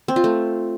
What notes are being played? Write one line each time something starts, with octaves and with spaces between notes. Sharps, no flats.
C4
F4
A3